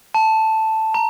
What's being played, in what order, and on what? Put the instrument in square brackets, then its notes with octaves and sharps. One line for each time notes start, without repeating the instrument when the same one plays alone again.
[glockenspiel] A5
A#5